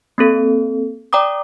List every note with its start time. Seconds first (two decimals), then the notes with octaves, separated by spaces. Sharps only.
0.18 A#3 C4 A4
1.13 D5 G5 A#5 D6 D#6